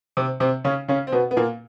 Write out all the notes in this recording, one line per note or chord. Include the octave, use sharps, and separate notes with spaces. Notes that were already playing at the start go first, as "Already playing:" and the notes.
C3 C4
C3 C4
C#3 C#4
C#3 C#4
C4
B2 B3
B3
A#2 A#3